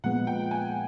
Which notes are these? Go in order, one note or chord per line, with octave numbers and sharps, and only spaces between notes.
A#2 F3 G#3 B3 F#5
G5
G#5